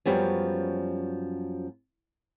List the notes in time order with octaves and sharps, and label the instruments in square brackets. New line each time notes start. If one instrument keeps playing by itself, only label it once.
[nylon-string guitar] F#2 F3 G3 B3 C#4